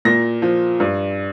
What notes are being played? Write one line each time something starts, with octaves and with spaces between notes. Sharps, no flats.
A#2 A#6
F3
G2